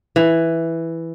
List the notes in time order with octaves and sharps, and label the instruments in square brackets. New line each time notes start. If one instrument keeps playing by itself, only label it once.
[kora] E3